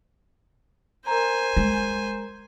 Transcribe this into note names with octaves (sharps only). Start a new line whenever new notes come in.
A#4 C5 G#5 A#5
G#3